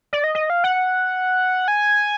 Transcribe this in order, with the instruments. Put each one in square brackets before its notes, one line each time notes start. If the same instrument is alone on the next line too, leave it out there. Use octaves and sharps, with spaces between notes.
[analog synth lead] D5
D#5
D#5
F5
F#5
G#5